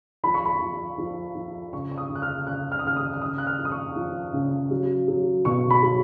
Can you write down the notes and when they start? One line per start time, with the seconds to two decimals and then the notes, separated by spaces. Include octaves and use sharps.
0.23 F3 B5
0.34 C#6
0.45 B5
0.61 F3
0.98 F3
1.35 F3
1.73 C#3 C#6
1.91 C#6
1.98 D#6
2.10 C#3
2.15 F#6
2.22 F6
2.47 C#3 F#6
2.72 F6
2.79 D#6
2.85 C#3 F6
2.97 D#6
3.13 F6
3.22 C#3 D#6
3.38 F#6
3.47 F6
3.59 F3
3.65 D#6
3.72 C#6
3.96 F3
4.33 C#3
4.71 F#3
5.08 F#3
5.45 B2 C#6
5.70 B5
5.83 F#3